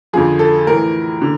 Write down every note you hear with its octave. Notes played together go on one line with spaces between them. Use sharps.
F2 D3 F3 G#4
A4
A2 E3 A#4
D3